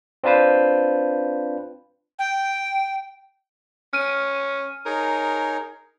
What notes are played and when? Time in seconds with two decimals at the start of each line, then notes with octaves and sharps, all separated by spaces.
0.24 C4 D4 F4 B4 C5
2.19 G5
3.93 C#4 F6 D#7
4.86 D#4 G#4 A#4 C#5